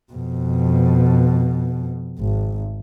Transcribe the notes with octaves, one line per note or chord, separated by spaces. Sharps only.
F2 B2
G#1